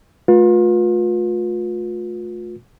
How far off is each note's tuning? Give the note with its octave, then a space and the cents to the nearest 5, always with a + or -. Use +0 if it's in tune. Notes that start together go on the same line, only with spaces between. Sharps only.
A3 -25 F4 +35 B4 -35